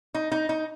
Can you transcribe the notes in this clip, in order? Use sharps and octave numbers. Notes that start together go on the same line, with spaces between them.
D#4
D#4
D#4